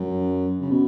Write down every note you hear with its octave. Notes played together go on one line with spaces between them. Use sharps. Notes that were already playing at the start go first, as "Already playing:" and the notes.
Already playing: F#2
C#3
B2